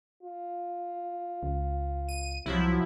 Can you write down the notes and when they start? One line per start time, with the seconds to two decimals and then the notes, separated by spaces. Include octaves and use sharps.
0.23 F4
1.43 C#2
2.08 D#7
2.46 C2 F3 F#3 E4